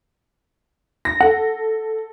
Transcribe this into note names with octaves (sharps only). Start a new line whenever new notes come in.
A#6
A4 F#5